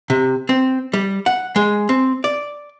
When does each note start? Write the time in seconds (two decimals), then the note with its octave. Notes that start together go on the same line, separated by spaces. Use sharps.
0.10 C3
0.49 C4
0.93 G3
1.26 F#5
1.56 G#3
1.89 C4
2.24 D5